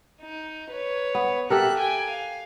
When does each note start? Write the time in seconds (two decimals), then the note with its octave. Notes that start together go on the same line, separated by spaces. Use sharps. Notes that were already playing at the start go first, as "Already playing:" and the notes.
0.22 D#4
0.71 B4 C#5
1.15 B3
1.50 G4 A4 A#4 E5 F#6
1.79 G5 G#5
2.10 F5